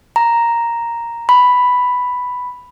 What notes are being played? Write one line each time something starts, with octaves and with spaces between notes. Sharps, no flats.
A#5
B5